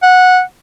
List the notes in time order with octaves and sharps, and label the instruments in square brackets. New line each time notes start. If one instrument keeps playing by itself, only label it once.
[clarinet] F#5